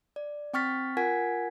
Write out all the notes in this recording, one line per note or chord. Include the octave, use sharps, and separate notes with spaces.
D5
C4 G5 C#6 F6 A6 B6
F4 A#4 F#5 G#5 G#6 B6